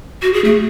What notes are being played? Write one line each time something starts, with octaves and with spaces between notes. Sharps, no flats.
F#4
G#4
A3